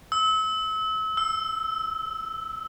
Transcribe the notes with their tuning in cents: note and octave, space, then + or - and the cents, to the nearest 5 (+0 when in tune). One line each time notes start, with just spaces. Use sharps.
E6 -35
E6 +0